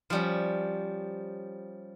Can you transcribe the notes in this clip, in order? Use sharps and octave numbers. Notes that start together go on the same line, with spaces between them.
F3 G3 C#4